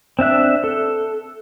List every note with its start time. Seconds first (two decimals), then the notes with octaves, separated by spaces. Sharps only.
0.19 C4 D4 E5 F#6
0.64 A4